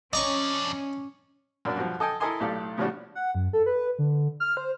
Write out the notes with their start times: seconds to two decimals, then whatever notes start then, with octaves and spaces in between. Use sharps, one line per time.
0.13 F2 C#4 D5 D#5 A#5 C#6
1.65 F#2 B2 A#3 D4
1.77 G2 B2 F3
2.00 A4 D#5 G5 G#5
2.20 E4 A4 A#4 D#5 G#5 C6
2.40 B1 A2 G4 A4 D5 F5
2.77 A2 C#3 F3 G3 D4 F#4
3.15 F#5
3.35 F#2
3.53 A4
3.66 B4
3.99 D3
4.40 F6
4.57 C5